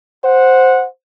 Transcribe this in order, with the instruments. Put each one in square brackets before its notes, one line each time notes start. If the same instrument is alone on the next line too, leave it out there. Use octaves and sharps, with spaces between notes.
[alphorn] C5 [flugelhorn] F#5